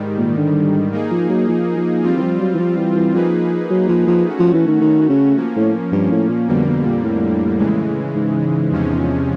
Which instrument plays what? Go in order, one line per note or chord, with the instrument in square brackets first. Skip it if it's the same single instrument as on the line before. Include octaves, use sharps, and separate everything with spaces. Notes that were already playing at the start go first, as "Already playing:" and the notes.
Already playing: [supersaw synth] G#2 D#3 G3
[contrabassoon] A#2
D3
[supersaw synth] A#3 D#4 G#4
[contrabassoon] F3
F#3
F3
F3
[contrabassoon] F3 [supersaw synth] G3 C4 F4
[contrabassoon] E3
F3
F#3
E3
F3
E3
E3
[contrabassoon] F3 [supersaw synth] A#3 D#4 G#4 B4
[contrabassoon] F#3
F3
F3
[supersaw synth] A3 C#4 F#4
[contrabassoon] F3
E3
D#3
D#3
C#3
[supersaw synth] F3 A#3 C#4
[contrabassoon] A2
G2
A2
A#2
[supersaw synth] F2 D3 G3 A#3 [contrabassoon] B2
[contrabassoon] B2
A#2
A2
[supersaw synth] C#3 E3 G#3
[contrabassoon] G#2
[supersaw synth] E2 C3 F3 G#3 C#4